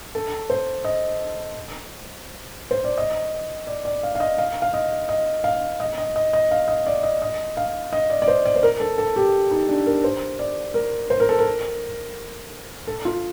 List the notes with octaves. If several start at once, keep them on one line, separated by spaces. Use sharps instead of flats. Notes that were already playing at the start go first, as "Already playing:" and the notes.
A4
C5
D#5
C5
D5
D#5
D5
D5
F5
F5
D#5
F5
F5
D#5
D#5
F5
D#5
D#5
D#5
D#5
F5
D#5
D5
D#5
D#5
F5
D#5
D5
D5
C5
D5
C5
A#4
A4
A4
G4
D#4
D4
A#4
C5
D5
A#4
C5
A#4
A4
A#4
A4
F4